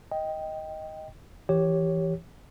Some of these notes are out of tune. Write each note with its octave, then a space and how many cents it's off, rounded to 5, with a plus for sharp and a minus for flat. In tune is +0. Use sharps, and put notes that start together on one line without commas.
D#5 +10 G5 +0
E3 +15 G4 +0 C#5 +0